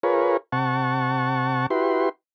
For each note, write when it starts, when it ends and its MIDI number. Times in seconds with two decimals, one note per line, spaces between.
0.03 0.37 65
0.03 0.37 68
0.03 0.37 70
0.03 0.37 71
0.03 0.37 73
0.52 1.66 48
0.52 1.66 78
0.52 1.66 81
0.52 1.66 85
1.70 2.09 64
1.70 2.09 66
1.70 2.09 67
1.70 2.09 71
1.70 2.09 84